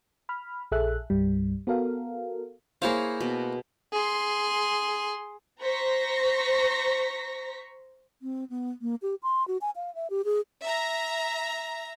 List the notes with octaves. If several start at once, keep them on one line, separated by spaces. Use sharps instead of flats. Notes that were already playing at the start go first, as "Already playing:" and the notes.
B5 F6
A#1 G#4 A4 E5 F#6
C2 G2 G3
B3 F#4 A4 A#4 F5
A#3 E4 G#4 C5 C#5 F5
B2
G#4 C6
C5 A#5 C#6 A#6 B6
C4
B3
A#3
G4
C6
F#4
G#5
F5
E5
G4
G#4
E5 A#5